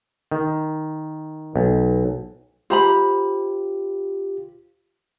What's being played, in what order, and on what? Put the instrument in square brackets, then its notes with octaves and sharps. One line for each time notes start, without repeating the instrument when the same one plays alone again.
[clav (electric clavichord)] D#3
B1
[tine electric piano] F4 G4 [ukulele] C5 A#5 B5